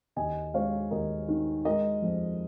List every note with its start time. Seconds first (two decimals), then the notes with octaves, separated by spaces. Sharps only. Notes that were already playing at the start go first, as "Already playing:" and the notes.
0.16 D#2 D#5 G#5
0.54 G#3 C#5 F5
0.91 D#2 A#4 D#5
1.28 D#3
1.65 G#3 A#4 D#5
2.02 F2